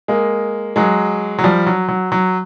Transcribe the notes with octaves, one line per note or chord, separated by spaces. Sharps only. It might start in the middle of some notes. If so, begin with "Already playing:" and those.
G#3 A#3
F#3 G#3
F#3
F3 G3
F#3
F#3
F#3